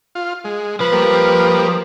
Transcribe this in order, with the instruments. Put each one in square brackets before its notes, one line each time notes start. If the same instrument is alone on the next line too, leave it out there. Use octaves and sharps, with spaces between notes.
[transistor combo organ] F4
G#3
[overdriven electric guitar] F3 [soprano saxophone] B4
[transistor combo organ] G3 A#3